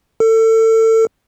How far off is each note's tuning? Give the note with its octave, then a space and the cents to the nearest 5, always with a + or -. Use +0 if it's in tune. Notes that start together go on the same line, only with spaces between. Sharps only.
A4 +30